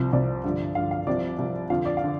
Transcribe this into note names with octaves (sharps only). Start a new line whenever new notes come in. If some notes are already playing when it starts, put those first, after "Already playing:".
Already playing: C2 C3 F3 C5
C2 C3 F3 D5
G2 D3 F3
G2 D3 F3 F5
F5
C2 C3 F3 D5
C2 C3 F3
F2 D3 F3 F5
D5
F5
D3